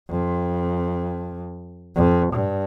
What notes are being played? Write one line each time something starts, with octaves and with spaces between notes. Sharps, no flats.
F2
F2
G2